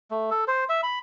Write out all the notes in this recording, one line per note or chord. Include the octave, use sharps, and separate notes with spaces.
A3
A4
C5
E5
B5